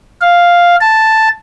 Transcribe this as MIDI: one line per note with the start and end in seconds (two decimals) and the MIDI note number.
0.21 0.76 77
0.81 1.29 81